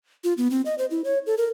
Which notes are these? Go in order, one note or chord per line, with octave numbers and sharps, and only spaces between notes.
F4
B3
C4
D#5
C5
E4
C#5
A4
A#4